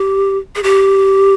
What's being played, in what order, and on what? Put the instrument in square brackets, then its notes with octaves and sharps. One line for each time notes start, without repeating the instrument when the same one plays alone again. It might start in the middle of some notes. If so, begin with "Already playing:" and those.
Already playing: [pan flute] G4
G#4
G4